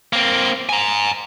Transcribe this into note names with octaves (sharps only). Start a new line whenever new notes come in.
A#3 C4
G#5 A#5